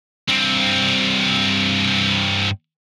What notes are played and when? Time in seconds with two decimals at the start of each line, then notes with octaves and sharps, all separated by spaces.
0.28 G2 C4